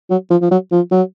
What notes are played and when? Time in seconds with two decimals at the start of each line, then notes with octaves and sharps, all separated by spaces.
0.10 F#3
0.30 F3
0.42 F3
0.51 F#3
0.71 F3
0.91 F#3